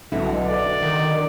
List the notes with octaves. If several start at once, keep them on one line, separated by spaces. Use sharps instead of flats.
B1 D3 E4 F#4
D5
D#3